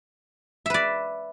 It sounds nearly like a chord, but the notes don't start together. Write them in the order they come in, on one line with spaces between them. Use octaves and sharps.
E5 B4 D5